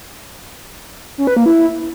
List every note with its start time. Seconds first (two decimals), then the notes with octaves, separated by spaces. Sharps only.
1.18 C#4
1.27 B4
1.37 A#3
1.46 E4